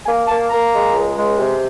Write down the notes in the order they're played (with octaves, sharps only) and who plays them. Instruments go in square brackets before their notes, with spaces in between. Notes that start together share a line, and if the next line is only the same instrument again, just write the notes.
[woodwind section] A#3 G#5
A#3 A5
A#3 A#5
G#3
C#2
G#3
C3